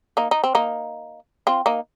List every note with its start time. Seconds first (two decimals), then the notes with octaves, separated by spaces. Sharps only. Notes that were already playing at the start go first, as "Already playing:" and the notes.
0.17 A#3 D#4
0.31 D#4
0.44 C4
0.55 A#3 D#4
1.47 C4 F4
1.66 A#3 D#4